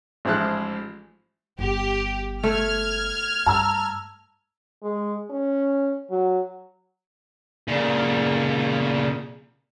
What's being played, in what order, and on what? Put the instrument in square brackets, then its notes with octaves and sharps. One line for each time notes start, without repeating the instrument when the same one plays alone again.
[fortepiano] A1 G#2 F3 G#3 E4 F#6
[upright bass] G1 [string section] G4
[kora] A3 [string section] F6 G#6
[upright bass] G2 [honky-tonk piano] A5 A#5 E6
[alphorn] G#3
C#4
F#3
[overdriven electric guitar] A#2 C#3